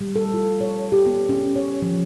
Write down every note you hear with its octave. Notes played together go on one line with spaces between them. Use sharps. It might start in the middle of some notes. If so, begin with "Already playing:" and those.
G3
A4
F4
C#5
G4
B3
C#4
C#5
F3